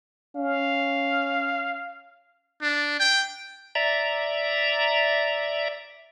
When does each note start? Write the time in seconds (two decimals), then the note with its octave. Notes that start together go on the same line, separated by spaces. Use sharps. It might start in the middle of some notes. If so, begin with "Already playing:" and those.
0.36 C#4 F5
2.62 D4
3.00 G5
3.75 D5 E5 A#5